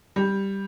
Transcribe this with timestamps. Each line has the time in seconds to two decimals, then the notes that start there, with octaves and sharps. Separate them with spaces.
0.16 G3